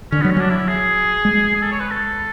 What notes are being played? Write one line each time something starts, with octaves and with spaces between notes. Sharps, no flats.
D3 C#4
F#3 B3
C#4
F#3 D4
E4
G#4
G#3
G#4
A4
C#5
B4
A4